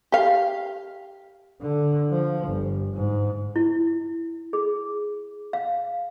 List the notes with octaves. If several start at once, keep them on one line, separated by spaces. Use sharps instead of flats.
G4 F5
D3
F3
G1
G#2
E4
G#4
F5